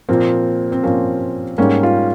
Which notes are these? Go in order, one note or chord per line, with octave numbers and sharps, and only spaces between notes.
A#2 F3 A#3 C4
C4
A#2 F3 A#3 C#4
G#2 G3 A#3 C#4
F4